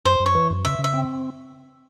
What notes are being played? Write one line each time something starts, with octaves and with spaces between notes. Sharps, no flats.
F#2 C5
F#2
C#5
E3
F#2
C#3 E5
C#3
E5
C4